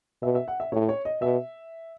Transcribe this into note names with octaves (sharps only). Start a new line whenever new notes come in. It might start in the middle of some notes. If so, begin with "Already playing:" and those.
B2 E5
E5
F#5
E5
A2 C#5
C#5
D#5
B2 E5